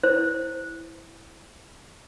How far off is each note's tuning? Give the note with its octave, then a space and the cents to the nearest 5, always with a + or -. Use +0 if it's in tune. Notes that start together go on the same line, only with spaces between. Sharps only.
E4 +0 C5 +0